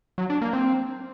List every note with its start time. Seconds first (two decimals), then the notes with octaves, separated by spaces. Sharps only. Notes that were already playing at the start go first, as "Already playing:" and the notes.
0.18 F#3
0.30 D4
0.42 A#3
0.53 C4